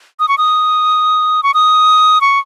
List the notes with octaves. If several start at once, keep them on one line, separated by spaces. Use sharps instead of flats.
D#6
C#6
D#6
C#6
D#6
C#6